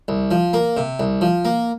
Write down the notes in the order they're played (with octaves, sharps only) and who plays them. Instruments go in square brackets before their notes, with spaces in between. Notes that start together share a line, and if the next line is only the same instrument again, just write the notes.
[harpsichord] C2
F3
A#3
C3
C2
F3
A#3